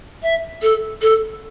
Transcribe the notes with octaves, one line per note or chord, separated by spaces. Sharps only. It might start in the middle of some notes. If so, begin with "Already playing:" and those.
E5
A4
A4